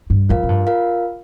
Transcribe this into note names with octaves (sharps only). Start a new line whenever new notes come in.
G2
F2 F4 A#4 F5
A#2
G2
F4 A#4 F5